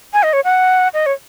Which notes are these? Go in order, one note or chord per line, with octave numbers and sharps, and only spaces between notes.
G#5
D#5
C#5
F#5
D#5
C#5